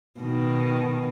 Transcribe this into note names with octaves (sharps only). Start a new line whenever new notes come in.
B2 D#3